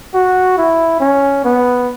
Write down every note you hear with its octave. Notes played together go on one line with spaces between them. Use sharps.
F#4
E4
C#4
B3